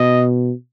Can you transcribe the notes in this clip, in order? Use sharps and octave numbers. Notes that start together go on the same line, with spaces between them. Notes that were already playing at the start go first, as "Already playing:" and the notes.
Already playing: B2 D#5